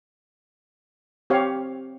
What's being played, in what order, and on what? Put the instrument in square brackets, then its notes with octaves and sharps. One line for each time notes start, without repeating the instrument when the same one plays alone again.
[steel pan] C4 G4 C#5 F5